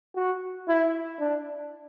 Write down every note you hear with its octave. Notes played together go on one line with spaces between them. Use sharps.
F#4
E4
D4